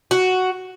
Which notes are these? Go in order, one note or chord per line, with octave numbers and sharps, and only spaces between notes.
F#4